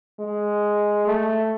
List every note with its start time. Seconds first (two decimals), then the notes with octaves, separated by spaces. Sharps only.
0.20 G#3
1.07 A3